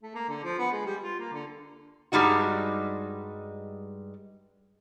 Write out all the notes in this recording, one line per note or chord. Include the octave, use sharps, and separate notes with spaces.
A3
A#3
D3
F3
B3
G#3
G3
F4
A#3
D3
G2 G3 G#3 D#4 F#4